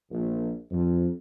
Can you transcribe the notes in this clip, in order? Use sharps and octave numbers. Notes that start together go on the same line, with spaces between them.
A#1
F2